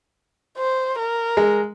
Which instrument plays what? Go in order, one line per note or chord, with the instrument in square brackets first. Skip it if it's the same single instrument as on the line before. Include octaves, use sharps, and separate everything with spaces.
[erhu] C5
A#4
[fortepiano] G#3